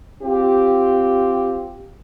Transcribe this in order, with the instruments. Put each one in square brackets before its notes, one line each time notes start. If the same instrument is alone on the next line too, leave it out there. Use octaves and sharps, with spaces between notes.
[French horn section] C4 F4 G4